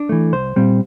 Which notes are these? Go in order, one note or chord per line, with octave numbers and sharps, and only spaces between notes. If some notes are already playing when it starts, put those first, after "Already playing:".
Already playing: D4
E3 A3
C2 C5
A#2 G3 C4